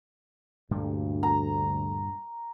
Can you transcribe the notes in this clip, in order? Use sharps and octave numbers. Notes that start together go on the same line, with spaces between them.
D2 G2 A#2 G3
A#5